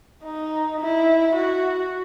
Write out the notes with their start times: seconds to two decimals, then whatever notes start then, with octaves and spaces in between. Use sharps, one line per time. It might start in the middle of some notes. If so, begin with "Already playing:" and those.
0.24 D#4
0.81 E4
1.36 F#4